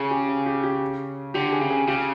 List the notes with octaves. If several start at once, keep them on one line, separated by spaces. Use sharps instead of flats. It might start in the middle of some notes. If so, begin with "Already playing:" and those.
Already playing: C#3 G#4
G4
G#4
G4
G4
D3 G4
G#4
C#3
G#4
C#3 G4